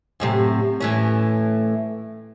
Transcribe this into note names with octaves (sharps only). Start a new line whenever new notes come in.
F#2 A2 C3
A2 E3 C#4